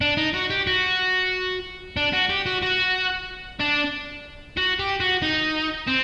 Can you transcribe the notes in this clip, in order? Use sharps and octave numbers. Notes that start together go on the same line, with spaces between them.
D4
D#4
F#4
G4
F#4
D4
F#4
G4
F#4
F#4
D4
F#4
G4
F#4
D#4
C4